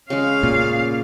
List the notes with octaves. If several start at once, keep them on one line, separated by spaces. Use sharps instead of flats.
C#3 G#3 C#4 F5
A#2